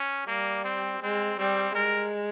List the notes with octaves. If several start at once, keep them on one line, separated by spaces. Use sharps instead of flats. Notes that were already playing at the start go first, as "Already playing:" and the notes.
Already playing: C#4
G3 A#3
C4
G#3 C4
G3 C4
G#3 A#4